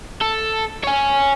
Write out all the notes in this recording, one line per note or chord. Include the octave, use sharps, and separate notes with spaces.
A4
C#5 G#5